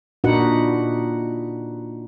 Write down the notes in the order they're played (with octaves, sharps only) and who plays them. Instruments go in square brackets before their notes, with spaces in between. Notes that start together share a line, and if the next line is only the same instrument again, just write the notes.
[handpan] A#2 D4 D#4 F#4 B4 F#5